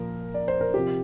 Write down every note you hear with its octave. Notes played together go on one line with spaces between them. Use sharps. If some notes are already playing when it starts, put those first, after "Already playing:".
Already playing: A#2 F3 A#4
D5
C5
A#4
C3 F3 G4